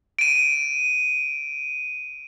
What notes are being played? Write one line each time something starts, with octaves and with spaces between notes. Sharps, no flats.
D7 D#7